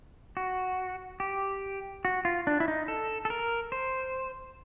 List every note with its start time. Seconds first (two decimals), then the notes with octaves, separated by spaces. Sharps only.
0.37 F#4
1.20 G4
2.05 F#4
2.25 F4
2.47 D4
2.60 E4
2.68 D#4
2.88 A4
3.25 A4
3.30 A#4
3.72 C5